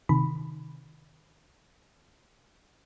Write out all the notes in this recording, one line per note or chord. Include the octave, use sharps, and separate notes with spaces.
C3 D#3 B5